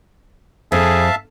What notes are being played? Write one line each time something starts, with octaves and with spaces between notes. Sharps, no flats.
F2 G#4 E5 F5 A5